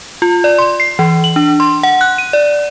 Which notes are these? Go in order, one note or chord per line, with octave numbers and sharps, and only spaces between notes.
F4
D5
C6
C7
E3
F#7
D4
C6
F#5
F#6
D#7
D5